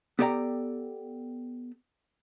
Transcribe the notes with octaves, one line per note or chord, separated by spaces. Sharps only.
B3 G4 A4 D5 G5 A#5